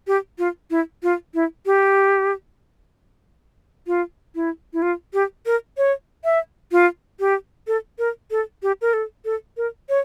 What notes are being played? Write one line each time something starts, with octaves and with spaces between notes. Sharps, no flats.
G4
F4
E4
F4
E4
G4
F4
E4
E4
F4
G4
A#4
C#5
E5
F4
G4
A4
A#4
A4
G4
A#4
A4
A4
A#4
C#5